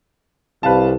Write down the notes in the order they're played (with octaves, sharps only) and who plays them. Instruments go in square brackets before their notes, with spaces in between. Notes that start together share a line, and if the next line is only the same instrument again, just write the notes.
[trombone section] C2 [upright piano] B4 F5 A5